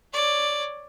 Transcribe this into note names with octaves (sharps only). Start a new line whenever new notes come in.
C#5 D5